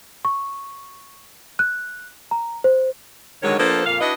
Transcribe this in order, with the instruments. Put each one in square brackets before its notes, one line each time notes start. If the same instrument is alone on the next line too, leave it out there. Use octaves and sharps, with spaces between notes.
[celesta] C#6
F#6
A#5
C5
[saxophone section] D3 D#3 F#3 G#3 C#5
F3 A#3 B3 D4 A4 C5
F2 A#2 A#3 F5
D4 E4 F#4 B4 D#5